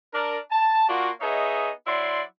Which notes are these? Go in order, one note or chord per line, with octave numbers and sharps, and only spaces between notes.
D4 A#4
A5
A#3 D4 F4 F#4
B3 D#4 G#4 C#5 D#5 E5
F#3 E4 D5 C6